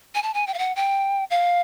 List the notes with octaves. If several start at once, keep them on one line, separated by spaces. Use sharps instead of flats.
G#5
A5
G#5
G5
F5
F#5
G5
F5